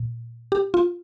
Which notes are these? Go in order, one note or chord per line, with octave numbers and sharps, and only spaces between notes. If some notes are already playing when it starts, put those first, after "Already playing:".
Already playing: A#2
G4
F4